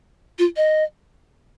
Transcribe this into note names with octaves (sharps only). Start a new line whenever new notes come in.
F4
D#5